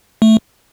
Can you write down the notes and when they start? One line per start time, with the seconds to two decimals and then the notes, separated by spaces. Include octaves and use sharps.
0.22 A3